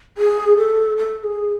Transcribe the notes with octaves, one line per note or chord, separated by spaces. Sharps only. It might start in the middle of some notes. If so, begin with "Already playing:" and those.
G#4
A4
A4
G#4